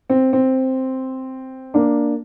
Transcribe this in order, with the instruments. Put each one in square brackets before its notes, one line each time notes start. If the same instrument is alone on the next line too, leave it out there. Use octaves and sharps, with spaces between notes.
[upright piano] C4
C4
A#3 D4